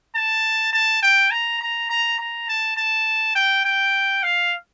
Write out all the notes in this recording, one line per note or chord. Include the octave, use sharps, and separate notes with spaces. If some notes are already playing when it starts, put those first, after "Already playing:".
A5
A5
G5
A#5
A#5
A#5
A#5
A5
A5
G5
G5
F5